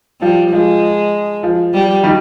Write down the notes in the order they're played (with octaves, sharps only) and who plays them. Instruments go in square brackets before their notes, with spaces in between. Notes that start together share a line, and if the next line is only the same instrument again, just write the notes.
[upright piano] F3 [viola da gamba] G3
[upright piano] F3 [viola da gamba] G#3
[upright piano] F3
[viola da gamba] G3
[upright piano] D#3 G3